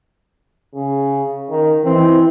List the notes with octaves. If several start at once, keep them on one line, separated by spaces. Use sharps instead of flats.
C#3
D#3
E3 C4